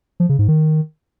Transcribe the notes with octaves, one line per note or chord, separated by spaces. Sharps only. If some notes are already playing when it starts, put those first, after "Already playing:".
F3
C#3
G#2
D#3